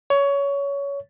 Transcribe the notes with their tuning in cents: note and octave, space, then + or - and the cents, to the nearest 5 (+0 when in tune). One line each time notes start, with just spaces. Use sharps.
C#5 +20